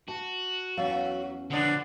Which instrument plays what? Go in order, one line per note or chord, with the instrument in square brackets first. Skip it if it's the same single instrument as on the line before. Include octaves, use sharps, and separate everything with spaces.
[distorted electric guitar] F#4 [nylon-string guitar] A5
[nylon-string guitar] E2 C#4 F5 [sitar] F#3
[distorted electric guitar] D3 F3 [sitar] F#3 B3 D4